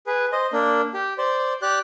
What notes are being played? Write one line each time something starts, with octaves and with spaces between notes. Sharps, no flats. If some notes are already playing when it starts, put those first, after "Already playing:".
G#4 B4
C5 D#5
A#3 D4
G4
C5 D5
G4 D5 F#6